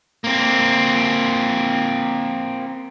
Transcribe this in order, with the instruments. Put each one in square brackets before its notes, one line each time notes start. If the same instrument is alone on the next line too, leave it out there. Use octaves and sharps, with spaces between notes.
[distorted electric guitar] A#3 C4